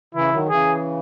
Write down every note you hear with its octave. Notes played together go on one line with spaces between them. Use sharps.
C#3 E3 E4
D#3 F#3
C#3 E3 G#4